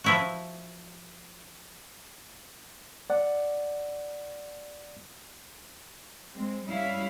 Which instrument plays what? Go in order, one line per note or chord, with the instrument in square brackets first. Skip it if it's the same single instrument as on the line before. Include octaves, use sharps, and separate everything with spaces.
[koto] F3 E4 F#4
[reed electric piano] D5 F#5
[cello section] G#3 C4
G3 C#4 E4 F5